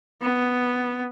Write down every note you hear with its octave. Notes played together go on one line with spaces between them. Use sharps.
B3